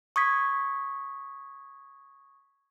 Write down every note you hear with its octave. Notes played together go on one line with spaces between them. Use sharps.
C#6 D#6 G#6 B6